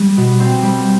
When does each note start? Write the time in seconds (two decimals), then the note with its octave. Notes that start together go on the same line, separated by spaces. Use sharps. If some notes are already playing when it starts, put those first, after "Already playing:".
Already playing: G3
0.17 B2
0.40 C4
0.62 G3